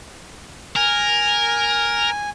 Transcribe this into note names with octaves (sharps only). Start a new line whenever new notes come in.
A#4 G#5